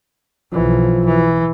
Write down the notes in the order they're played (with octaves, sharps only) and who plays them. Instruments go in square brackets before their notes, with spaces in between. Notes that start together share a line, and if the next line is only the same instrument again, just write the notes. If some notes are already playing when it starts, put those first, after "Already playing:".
[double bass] B1 E3 [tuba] F3
[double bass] E3